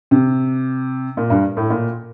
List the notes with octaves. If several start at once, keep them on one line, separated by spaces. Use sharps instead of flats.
C3
A#2
G2
A2
A#2